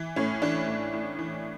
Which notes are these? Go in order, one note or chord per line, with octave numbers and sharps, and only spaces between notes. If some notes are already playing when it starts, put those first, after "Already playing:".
Already playing: E3
A2 C#4
E3 D4
A2
A2
E3